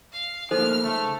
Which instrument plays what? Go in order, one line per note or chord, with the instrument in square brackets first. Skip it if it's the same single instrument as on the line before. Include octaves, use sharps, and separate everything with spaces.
[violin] F5
[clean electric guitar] F3 A3 A#3 [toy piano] D#4 A4 C5 [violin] F6
[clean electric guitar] C#2 [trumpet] A3